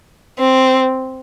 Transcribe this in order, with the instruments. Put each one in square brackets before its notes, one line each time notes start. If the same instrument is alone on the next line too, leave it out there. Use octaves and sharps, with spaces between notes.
[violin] C4